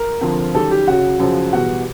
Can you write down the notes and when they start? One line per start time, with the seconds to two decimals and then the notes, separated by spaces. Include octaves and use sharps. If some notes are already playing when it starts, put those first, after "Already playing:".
Already playing: A#4
0.21 F2 D3 F3
0.54 F#2 D#3 G3 A4
0.71 G4
0.87 F#2 C#3 F#3 F#4
1.19 F#2 C#3 F3
1.53 E2 B2 G3 F#4